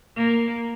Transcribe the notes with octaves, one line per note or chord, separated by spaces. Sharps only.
A#3